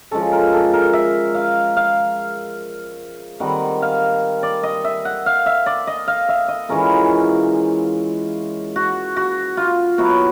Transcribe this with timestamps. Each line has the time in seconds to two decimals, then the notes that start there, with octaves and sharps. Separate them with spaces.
0.11 F3 G#3 C#4 A4
0.32 A#4
0.53 A4
0.73 A#4
0.93 E5
1.35 F5
1.77 F5
3.40 D#3 G3 C4 F#5
3.82 F5
4.43 D5
4.63 D#5
4.84 E5
5.05 F#5
5.26 F5
5.46 E5
5.66 D5
5.87 D#5
6.08 F5
6.29 E5
6.48 D#5
6.69 E3 G#3 C#4 F4 A#4
8.76 F#4
9.16 F#4
9.57 F4
9.98 F#3 B3 E4 F#4